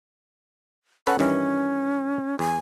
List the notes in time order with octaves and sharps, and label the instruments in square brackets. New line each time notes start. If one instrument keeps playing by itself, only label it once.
[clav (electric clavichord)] C#4 A4 B4 [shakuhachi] F#5
[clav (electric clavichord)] G2 D#3 E3 [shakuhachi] C#4
[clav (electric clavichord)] E2 [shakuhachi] G#5